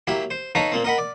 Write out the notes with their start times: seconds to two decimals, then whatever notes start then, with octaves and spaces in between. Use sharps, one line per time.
0.07 F#3 A#3 E4 G4
0.30 C5
0.55 D#4 A4 B4 C#5 F5 A#5
0.72 A#2 A#3 C4
0.84 A#4 D#5 F#5 B5
0.98 D5